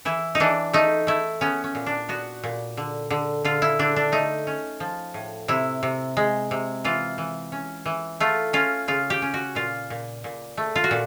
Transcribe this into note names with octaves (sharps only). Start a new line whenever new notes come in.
E3 E4
D#4
E3 D4
A3 D#4
A3 E4
B3 C#4
C#4
A#2
D4
B3 F#4
A#2
D3
D3
D3 F4
E4
D3 D4
D4
A3 D#4
C#4
F3
A2
C3 E4
C3
G#3
C3
E3 F4
E3
C#4
E3
A3 F4
C#4 F4
C#3 F4
G4
C#4
F#4
A#2 F4
A#2
A#2
A3
F4
F#4
A#2